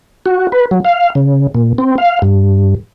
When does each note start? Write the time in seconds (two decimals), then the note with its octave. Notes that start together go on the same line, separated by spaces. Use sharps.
0.26 F#4
0.52 B4
0.71 F#3
0.85 F5
1.15 C#3
1.55 A#2
1.78 C4
1.98 F5
2.22 G2